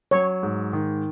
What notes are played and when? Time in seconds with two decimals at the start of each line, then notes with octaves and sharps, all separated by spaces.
0.11 F#3 C#5
0.43 G#2
0.73 D#3